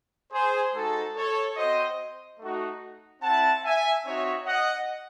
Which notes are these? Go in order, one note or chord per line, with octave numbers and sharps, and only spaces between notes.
G#4 C5
G#3 D#4 F#4 A4
A4 C#5
C4 F#4 C5 D#5
A3 D#4 F#4
C4 E4 F#5 A5
E5 G#5
C4 D#4 F#4 C#5 E5
D#5 F#5